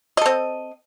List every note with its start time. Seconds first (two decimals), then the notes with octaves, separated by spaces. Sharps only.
0.17 D#5
0.21 A4
0.26 C4